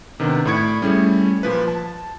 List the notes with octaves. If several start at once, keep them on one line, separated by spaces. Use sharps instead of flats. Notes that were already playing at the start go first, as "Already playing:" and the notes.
C3 D#3 B3 D4
A2 D5 B5 C#6 G#6 C#7
G3 A3 C#4 E4 G#4
A#2 F3 B4
A5